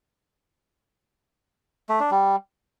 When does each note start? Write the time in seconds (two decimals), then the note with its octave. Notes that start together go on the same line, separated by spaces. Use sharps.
1.89 A3
2.00 D4
2.11 G3